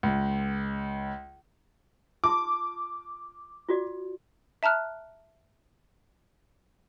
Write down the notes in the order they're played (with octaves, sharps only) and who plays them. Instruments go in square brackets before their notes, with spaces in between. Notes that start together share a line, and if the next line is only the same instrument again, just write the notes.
[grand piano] C#2
[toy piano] F4 A5 C6 [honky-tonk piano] D6
[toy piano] F4 F#4 D5
[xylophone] E5 A5 A#5 F6 F#6